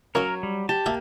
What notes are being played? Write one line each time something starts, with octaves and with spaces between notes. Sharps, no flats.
F#3 A#3 C#4 A#4 C#5
G3
G4 A5
A#3 G4 E5 G5